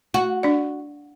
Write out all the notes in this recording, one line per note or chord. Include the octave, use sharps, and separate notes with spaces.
F#4
D4 D5